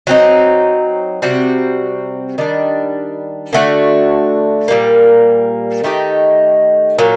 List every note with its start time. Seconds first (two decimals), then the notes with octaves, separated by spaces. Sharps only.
0.07 F#3 C4 D#4
1.22 C3 G3 C4 F#4
2.38 D#3 G3 D4
3.53 D3 A3 D4 F#4
4.68 A#2 G3 A#3
5.84 D#3 A3 D#4 G4
6.98 A#2 F#3 A#3